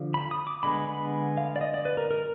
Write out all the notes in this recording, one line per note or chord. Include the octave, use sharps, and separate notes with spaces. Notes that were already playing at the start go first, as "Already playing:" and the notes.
Already playing: D3 F3
B5
D#6
D6
D3 G#3 B3 B5
B5
F5
D5
D#5
D5
B4
A#4
A#4